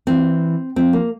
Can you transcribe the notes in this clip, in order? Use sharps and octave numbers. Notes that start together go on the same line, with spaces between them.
E3 C4
F3 C4
A#3